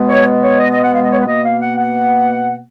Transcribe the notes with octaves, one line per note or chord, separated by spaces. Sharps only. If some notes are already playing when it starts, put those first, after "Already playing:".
Already playing: B2 G#3 B3
C#5
C#5
D#5
D#5
F#5
F5
D#5
C#5
B4
B2 A#3 D#5
F5
F#5
F#5